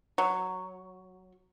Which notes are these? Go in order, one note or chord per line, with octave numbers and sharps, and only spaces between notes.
F#3